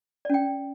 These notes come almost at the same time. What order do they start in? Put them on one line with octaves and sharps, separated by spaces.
D5 C#4 G5